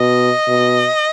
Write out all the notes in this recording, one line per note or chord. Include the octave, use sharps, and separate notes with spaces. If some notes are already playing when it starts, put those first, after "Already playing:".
Already playing: B2 D#5
B2